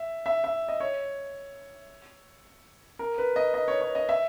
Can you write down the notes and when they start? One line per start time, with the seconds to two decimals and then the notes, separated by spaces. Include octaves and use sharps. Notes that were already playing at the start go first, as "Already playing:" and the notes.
Already playing: E5
0.26 E5
0.44 E5
0.69 D#5
0.80 C#5
2.99 A#4
3.18 B4
3.36 D#5
3.54 D#5
3.68 C#5
3.81 C#5
3.95 D#5
4.09 E5